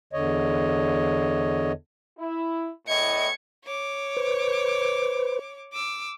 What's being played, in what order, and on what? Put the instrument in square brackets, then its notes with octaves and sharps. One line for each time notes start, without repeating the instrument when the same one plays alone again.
[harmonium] E2 D3 C#5 D#5
[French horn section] E4
[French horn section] E2 A2 D#5 [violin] G#6 C#7
[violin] C#5 D6
[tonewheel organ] B4 C5
[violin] D6 E6